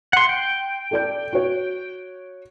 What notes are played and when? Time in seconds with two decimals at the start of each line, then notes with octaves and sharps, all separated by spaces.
0.13 F#5 C6
0.29 G5
0.91 A4 D5 G6
1.33 F#4 C#5